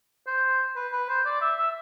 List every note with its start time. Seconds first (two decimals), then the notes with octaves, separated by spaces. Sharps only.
0.27 C5
0.76 B4
0.93 B4
1.09 C5
1.26 D5
1.41 E5
1.58 E5